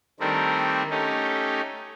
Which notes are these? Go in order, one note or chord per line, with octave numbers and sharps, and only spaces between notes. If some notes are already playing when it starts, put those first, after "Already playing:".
D#3 G3 A3 C4 D4 A#4
A3 C#4 D#4 G4